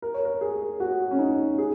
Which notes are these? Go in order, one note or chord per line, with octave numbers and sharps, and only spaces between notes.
A#4
C#5
A#4
G#4
F#4
C#4
D#4
G#4